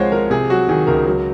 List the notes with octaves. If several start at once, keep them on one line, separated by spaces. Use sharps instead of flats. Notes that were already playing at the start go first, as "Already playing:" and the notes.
Already playing: C2 F3 G#3 C5 C#5 F5 F#5
F3 A#4
C3 G#4
F#3 F#4
D#3 G#4
C#2 A#4
F#3